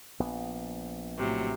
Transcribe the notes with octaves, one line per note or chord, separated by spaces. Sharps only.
A#1 B3
A2 C3 F#3